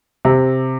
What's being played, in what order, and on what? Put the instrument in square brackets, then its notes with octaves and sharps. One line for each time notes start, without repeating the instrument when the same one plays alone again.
[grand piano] C3